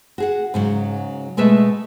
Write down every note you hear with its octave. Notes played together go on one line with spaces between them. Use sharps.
F#4 G#4 F#5
G#2 C#3 F#3
B2 G#3 A3 B4 E5 A5